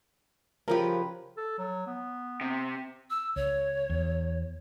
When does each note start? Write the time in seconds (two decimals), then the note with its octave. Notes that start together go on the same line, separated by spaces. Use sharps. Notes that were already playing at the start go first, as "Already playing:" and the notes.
0.68 C#3 F3 G4 A#4 B4
1.37 A4
1.58 F#3
1.87 B3
2.41 C3
3.10 E6
3.36 C#2 C#5
3.90 E2